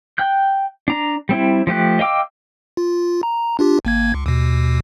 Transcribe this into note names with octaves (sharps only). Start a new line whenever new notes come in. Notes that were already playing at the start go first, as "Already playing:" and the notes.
G5 F#6 G6
D4 A#5
G3 C4 E4
F3 A3 G4 F#6
D#5 F5 G5 D6 E6
F4
A#5
D4 F4 G4
G#1 A#3 G#6
C#2
D#2 B2